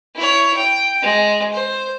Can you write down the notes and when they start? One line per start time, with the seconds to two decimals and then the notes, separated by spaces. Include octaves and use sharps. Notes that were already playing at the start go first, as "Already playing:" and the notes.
0.16 E4 C#5
0.57 G5
1.02 G#3
1.53 C5